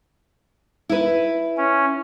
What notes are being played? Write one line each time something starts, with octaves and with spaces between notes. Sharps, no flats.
E4 B4
C#4